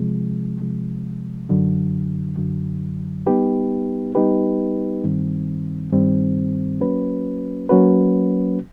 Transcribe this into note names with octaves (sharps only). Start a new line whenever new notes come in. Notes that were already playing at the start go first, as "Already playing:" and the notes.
Already playing: C3 F3 G#3
C3 F3 G#3
F#2 D3 F#3
F#2 D3 F#3
G3 B3 D#4 G4 B4
G3 B3 D#4 G4 B4
G2 D#3 G3 C4
G2 D#3 G3 C4
F#3 A#3 C#4 F#4 B4
F#3 A#3 C#4 F#4 B4